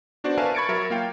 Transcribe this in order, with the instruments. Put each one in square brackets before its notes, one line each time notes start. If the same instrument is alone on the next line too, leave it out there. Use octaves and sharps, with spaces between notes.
[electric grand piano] B3 D4 F#4 C5 D5
A#4 B4 E5 F5 G#5 A5
B5 C#6 G#6 A6 C#7 D7
F#3 A#4 E5
A#3 F4 F5 G5